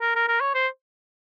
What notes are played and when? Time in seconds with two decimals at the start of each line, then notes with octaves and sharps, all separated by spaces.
0.01 A#4
0.15 A#4
0.28 A#4
0.41 C#5
0.54 C5